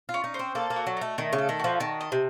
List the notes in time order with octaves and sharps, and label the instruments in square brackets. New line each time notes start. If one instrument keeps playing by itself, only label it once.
[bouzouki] F4
[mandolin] C#4
[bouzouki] D#4
[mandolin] C5
[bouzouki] C4
[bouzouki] A#3 [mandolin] A4
[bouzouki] A#3
[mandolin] F#4
[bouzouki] F#3
[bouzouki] A3 [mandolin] D#4
[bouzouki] D#3 [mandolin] A3
[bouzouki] C#3
[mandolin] A4
[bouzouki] D#3
[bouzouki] F3 [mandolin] F#4
[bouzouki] D#3 [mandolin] A5
[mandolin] D#5
[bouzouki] C3